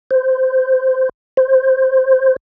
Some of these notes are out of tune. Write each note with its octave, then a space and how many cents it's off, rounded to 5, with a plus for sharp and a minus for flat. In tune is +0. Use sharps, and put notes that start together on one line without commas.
C5 -10
C5 +5